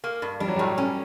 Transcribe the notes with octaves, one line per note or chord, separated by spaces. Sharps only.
A#3
G2
G3 D4
F#3
A2 G3
C#4